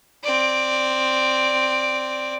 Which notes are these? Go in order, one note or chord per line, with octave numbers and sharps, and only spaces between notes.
C4 D5